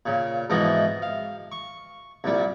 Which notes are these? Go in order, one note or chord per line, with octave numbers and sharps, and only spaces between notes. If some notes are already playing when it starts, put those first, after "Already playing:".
A#2 C#3
G#2 B2 E3 F3 C4 D#5
F5
C#6
C2 A#2 G3